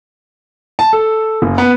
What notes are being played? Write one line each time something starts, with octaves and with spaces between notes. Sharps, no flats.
A5
A4
F#1
B3